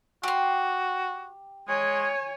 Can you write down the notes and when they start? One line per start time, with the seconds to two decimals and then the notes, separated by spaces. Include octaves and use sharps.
0.23 F#4 G4 C6
1.68 G#3 C#5 G#5